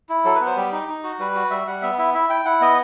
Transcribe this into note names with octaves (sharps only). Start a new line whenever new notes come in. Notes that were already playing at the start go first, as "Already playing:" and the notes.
E4
F#3 A4
B4
B3
C5
G3 G4
D#4
D#4
F#4
G3 B4
F#4
G3 E5
G3 F#5
B3 E5
E4 E5
E4 E5
E4 G5
E4 F#5
B3 D#5